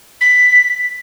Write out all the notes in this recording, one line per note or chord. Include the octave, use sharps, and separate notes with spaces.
B6